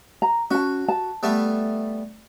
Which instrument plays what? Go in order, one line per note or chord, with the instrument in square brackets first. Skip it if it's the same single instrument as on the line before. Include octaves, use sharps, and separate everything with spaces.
[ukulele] A#5
[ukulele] C#4 A5 [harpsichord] F#4
[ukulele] A5
[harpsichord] G3 A3 B3